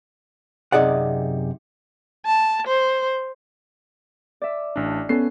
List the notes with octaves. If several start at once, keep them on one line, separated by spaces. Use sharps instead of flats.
F#2 C3 D#4 G#4 D5 F#5
A5
C5
D5 E5
A1 D4
B3 C#4 A4 C7